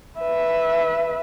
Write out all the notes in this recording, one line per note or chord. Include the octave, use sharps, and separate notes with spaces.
B4 E5